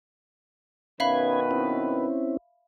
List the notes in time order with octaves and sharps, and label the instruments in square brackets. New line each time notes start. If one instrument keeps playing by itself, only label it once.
[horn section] B2 D#3 B4 [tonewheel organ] C#4 G#6 [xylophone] E5 F5 B5
[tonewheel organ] C4 C#4 E4